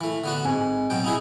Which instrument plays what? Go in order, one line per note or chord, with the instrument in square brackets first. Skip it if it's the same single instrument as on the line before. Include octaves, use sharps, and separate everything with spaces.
[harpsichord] E3 A3
D3 B3 F#4
[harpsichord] G#2 [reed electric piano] C4 G#5
[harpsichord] B2 F#3 G5
D#4 E4 G#4